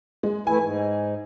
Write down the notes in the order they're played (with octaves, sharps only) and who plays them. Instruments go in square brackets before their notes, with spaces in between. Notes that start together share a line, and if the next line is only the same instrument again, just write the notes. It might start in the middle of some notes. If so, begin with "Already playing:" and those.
[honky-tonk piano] G#3
[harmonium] E3 A3 E4 [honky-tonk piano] G#5
[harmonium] G#2